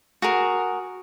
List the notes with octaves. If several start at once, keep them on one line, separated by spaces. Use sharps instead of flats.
F#4 G#4 A#4